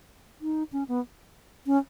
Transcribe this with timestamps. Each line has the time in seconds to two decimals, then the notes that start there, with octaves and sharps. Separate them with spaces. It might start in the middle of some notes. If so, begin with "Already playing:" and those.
0.41 D#4
0.73 C#4
0.88 B3
1.66 C#4